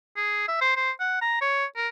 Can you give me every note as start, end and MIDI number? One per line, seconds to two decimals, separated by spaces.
0.16 0.44 68
0.48 0.58 76
0.61 0.72 72
0.76 0.91 72
1.00 1.21 78
1.22 1.38 82
1.41 1.65 73
1.76 1.88 70